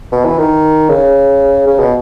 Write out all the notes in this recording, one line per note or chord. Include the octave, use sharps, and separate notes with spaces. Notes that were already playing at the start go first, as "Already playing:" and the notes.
B2
E3
D#3
C#3
C#3
B2